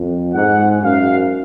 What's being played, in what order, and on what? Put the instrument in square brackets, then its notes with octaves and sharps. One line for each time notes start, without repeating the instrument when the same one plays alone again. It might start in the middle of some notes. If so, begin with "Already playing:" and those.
Already playing: [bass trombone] F2
[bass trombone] G#2 [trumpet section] F#5
[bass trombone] F#2 [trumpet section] F5